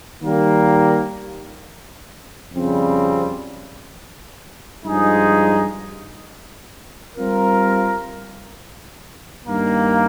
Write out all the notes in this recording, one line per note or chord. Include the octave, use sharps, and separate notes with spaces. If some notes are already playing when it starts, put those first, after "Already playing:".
D#3 G3 A#3
F2 C#3 G3 C4
G2 F3 G#3 D#4 G#4
G3 C4 F4 A#4
G2 D#3 A#3